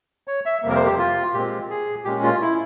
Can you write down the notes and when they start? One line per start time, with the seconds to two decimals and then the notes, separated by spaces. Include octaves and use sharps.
0.28 C#5
0.46 E5
0.62 F2 C3 G3 A#3
0.70 A#4
0.75 C5
0.86 G4
0.98 F4
1.34 A#2 G#3 C4 G4
1.70 G#4
2.05 A#2 G#3 C#4 G4
2.23 F4
2.41 E4